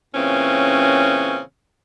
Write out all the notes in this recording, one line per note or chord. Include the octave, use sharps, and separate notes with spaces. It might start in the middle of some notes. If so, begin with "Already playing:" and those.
A#2 C#3 E3 C4 C#4